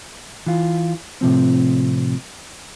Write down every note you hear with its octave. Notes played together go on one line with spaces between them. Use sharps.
E3 F4
A2 C3 F3 C4